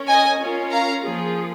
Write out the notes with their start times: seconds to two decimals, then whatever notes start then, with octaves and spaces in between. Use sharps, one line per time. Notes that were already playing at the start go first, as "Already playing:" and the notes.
Already playing: C#4 A#4 C#5
0.08 D#5 G#5
0.40 C#4 F4 A#4 C#5
0.71 F5 A#5
1.03 F3 A#3 F4 G#4